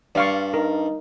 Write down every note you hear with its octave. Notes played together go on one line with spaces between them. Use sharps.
G2 D5 F5 C#6
D#4 A#4